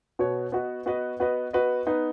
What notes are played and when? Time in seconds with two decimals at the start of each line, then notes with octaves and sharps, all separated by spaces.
0.19 B2 B3 F#4 C#5
0.52 B3 F#4 B4 D#5
0.86 B3 F#4 B4 D#5
1.20 B3 F#4 B4 D#5
1.53 B3 F#4 B4 D#5
1.87 B3 D#4 B4